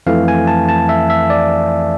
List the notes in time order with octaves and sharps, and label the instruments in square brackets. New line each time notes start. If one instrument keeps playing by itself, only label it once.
[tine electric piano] F2 E3 A3 F5
G#5
A5
A5
E5
E5
D5